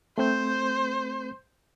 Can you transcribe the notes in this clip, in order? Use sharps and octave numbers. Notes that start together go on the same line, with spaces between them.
A3 C4 C5 G6